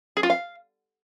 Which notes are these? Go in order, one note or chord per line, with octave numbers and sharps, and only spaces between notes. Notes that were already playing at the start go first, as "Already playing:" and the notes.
G#4
F4
F5